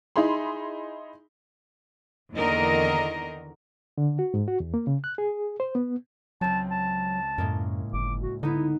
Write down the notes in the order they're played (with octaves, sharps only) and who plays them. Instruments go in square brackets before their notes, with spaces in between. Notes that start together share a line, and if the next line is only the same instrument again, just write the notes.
[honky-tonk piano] D#4 E4 G#4 B5 C6
[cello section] E2 D3 D#3 A#3 A#4 D#5
[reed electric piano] D3
F#4
G#2
F#4
E2
A#3
C#3
F#6
G#4
C5
B3
[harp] C#2 C4 [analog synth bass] F#3 [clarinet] A5
[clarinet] A5
[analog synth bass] F#2 [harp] A2 G#3 A#3
[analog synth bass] G1 [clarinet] D6
[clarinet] F#4
[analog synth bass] D3 [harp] B3 D#4 [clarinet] E4